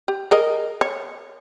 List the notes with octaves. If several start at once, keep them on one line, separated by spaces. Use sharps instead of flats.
G4
G#4 A#4 D#5
C#5